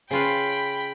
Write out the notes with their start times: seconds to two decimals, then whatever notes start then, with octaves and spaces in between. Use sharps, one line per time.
0.11 C#3 F4 B4 G5 B5